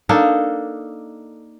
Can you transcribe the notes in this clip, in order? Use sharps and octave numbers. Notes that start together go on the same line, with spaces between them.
A#3 D4 D#4 A4